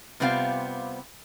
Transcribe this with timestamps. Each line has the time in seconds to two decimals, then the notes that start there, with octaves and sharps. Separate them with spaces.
0.20 C3 G3 B3 C4 F4 F5